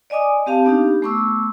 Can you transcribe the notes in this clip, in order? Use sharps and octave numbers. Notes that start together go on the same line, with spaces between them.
D5 D#5 G#5 D6 D#6
C4 G4 F5 A5
B3 D4 D#4 G4
A3 B3 C#6 D6 E6